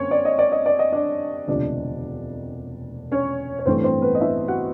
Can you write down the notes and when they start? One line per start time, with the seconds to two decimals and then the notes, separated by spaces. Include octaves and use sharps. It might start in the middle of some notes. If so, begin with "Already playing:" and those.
Already playing: F#2 D3 A#3 C4 C#4 C#5
0.11 D5
0.25 D#5
0.39 D5
0.52 D#5
0.66 D5
0.79 D#5
0.93 D4 D5
1.47 E1 D2 C3 F3 D4 D5
3.12 C#4 C#5
3.59 C#5
3.66 A1 G2 E3 A3 C4 C5
3.84 C4 C5
4.02 B3 B4
4.15 D#5
4.21 E4 E5
4.48 F#4 F#5